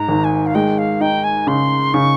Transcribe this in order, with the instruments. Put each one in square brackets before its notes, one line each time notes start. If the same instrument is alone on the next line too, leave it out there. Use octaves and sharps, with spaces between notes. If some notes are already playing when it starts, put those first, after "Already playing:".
Already playing: [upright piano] G#2 [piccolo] A#5
[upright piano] G#1
[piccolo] G#5
F5
[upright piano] G#3 [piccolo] G5
[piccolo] F5
[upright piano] D#4 [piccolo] G5
[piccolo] G#5
[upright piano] C#3 [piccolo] C6
[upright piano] C#3 [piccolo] C#6